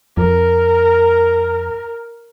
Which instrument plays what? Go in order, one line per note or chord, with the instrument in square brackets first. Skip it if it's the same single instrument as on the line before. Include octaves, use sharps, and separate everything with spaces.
[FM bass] F2 [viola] A#4